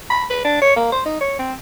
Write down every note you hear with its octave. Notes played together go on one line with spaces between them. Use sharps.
B5
B4
D4
C#5
A#3
C5
D#4
C#5
C4